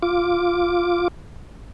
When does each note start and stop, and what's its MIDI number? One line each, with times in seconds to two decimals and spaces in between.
0.03 1.08 65
0.03 1.08 86